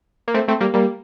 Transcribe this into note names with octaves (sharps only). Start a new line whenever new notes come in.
A#3
A3 C4
A3 C4
G3 A#3
G3 A#3